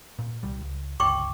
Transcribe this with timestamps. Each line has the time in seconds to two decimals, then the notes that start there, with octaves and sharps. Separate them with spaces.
0.19 A#2
0.43 C2 G3
0.62 C#2
1.00 G1 C#2 G5 C#6 D6